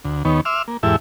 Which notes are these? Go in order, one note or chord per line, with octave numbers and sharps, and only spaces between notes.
D2
D#2 D#3 B3 C#5
E5 C6 D6 E6 F6
A#3
E2 G#2 E4 G4 A4 E5